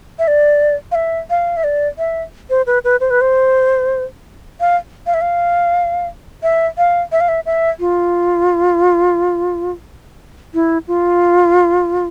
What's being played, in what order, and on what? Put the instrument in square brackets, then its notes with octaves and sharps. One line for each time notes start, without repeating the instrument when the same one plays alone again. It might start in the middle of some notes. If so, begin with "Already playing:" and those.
[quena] E5
D5
F5
E5
F5
E5
D5
E5
C5
B4
B4
C5
B4
C5
F5
F5
E5
F5
E5
F5
E5
F5
E5
E5
F4
E4
F4